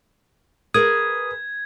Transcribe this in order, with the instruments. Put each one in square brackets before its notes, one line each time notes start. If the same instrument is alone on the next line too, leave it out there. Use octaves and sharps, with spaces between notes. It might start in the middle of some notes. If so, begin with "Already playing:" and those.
[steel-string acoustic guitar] G#4 A#4 B4 [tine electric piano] D#6 [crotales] G#6